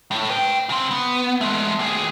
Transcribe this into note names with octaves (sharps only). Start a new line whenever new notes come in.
A2
B4 G5
C#3 C4
B3
G#3 A3
D#2 G#4